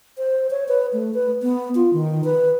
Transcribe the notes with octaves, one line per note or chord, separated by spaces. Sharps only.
C5
C#5
B4
A3
B4
B3
F4
D#3
B4